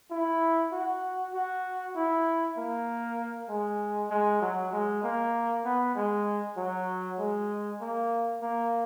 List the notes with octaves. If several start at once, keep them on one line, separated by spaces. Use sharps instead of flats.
E4
F#4
F#4
E4
A#3
G#3
G#3
F#3
G#3
A#3
B3
G#3
F#3
G#3
A#3
A#3